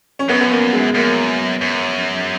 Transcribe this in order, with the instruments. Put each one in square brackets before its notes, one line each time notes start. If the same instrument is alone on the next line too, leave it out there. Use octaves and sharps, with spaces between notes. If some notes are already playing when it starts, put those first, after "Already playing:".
[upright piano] C#4
[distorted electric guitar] F#2 [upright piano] B3
[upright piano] B3
A#3
G#3
[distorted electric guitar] F#2 [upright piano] A#3
[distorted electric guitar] F#2